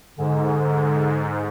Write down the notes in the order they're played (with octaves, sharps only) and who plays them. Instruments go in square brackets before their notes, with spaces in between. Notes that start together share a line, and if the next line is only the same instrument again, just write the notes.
[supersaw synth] G#2 [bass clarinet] D3